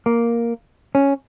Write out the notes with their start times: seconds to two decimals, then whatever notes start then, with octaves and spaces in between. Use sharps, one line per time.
0.06 A#3
0.95 C#4